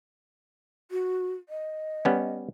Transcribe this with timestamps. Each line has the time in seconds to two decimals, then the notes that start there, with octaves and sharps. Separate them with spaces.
0.91 F#4
1.49 D#5
2.05 G3 B3 C#4